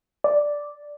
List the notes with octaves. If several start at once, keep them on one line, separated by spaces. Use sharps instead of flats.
D5